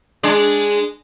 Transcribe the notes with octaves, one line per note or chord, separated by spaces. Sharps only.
G#3 D4